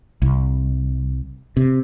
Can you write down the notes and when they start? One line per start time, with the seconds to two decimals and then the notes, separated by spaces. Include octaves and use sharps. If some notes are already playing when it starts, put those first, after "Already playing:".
0.22 C2
1.57 C3